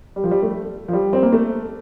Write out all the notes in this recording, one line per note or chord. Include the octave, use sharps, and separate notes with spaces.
G3
F3
G3
A3
F3
G3
C4
A#3
A3